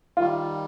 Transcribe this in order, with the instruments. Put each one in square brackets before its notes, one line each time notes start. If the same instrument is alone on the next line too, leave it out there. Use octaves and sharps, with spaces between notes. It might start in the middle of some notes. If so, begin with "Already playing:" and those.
[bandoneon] D#3 G3 [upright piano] F4